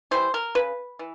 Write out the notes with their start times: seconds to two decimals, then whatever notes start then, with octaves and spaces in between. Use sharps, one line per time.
0.11 E3 G3 C5
0.34 A#4
0.55 C#3 B4
0.99 E3